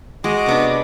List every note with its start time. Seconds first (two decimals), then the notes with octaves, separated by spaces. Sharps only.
0.24 G#3 F#4 D#5 D6
0.46 C3 B3 D4